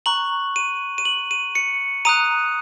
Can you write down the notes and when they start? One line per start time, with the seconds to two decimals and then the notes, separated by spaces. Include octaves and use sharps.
0.06 A#5 C#6 F#6 F#7
0.56 D#7
0.98 D#7
1.05 F#7
1.31 D#7
1.55 C#7
2.05 A#5 D#6 F#6 D#7